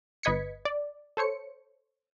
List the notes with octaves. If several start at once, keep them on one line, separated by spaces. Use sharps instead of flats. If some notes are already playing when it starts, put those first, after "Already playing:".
G1 B4 D#5 G#6 B6 C#7
D5
A4 C5 C#5 C#7